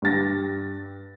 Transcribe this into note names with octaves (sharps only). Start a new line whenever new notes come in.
G2 G4 A6 A#6